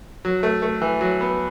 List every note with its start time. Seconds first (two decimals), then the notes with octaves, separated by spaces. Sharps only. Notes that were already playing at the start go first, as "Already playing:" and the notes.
0.25 F#3
0.43 A3
0.62 A3
0.82 E3
1.01 F#3
1.21 B3